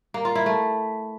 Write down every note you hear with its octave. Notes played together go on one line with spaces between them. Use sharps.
A#3
F4
E4
A3